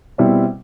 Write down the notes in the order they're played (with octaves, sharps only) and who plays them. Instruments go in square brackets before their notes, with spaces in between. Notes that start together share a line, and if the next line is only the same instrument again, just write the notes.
[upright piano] B2 G3 C4 E4